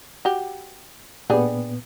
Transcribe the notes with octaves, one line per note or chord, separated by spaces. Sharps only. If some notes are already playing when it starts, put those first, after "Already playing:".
F#4 G4
A#2 B3 D4 G4 G#4